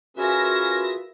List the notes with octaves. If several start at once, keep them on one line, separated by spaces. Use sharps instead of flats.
C#4 F4 F#4 G#4 A#4 B4 E5 A#6